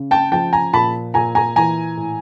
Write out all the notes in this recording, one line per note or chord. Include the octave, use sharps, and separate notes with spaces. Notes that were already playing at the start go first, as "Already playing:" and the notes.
Already playing: C#3
G5 A5
F3 G5 A5
G#5 A#5
A#2 A5 B5
A#2 G#5 A#5
G#5 A#5
E3 G#5 A#5
A2